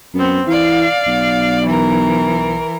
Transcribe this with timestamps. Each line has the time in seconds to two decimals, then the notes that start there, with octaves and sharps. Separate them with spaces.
0.14 F#2 B3 C4
0.47 E3 D5 F5
1.06 B1
1.65 E3 A#4